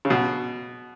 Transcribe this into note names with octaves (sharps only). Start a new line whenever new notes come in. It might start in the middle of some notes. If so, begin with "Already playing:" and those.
C#3
B2